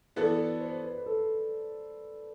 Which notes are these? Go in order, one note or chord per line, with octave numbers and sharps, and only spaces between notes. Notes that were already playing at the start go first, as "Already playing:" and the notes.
E3 B3 F#4 A4 D5
B4
C5
B4
B4
A4